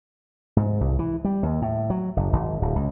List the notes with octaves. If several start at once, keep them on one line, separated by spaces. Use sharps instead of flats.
G#2
C2
E3
G3
D#2
A2
F#3
F#1
G#1
D1
C#2